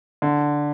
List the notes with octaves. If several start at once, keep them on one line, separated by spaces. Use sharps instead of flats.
D3